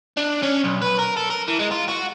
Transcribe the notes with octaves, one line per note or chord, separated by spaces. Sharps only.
D4
C#4
B1
B4
A#4
A4
A#4
E3
G#3
F4
F#4